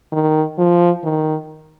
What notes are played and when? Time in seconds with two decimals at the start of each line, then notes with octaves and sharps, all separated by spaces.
0.12 D#3
0.58 F3
1.04 D#3